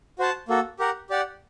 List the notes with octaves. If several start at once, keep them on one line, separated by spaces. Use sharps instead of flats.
F#4 C5 F#5 A5
A#3 F#4 A4
G4 A#4 F#5
G4 D5 F#5